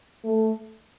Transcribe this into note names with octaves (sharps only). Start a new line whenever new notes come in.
A3